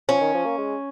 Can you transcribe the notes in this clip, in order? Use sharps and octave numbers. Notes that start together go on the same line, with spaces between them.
F3 C#4
D#3
F3
A#3
G#3